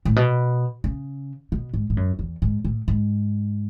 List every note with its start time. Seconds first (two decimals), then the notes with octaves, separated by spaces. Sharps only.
0.05 A2
0.16 B2
0.84 C#3
1.52 B2
1.74 G#2
1.90 G#2
1.97 F#2
2.19 E2
2.42 G#2
2.65 A2
2.88 G#2